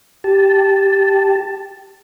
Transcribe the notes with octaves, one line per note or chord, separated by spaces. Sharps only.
G4 A5